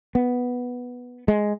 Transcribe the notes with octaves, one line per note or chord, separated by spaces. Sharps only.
B3
G#3